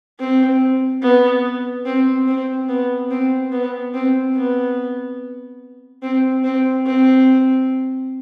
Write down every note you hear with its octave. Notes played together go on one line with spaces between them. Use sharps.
C4
B3
C4
C4
B3
C4
B3
C4
B3
C4
C4
C4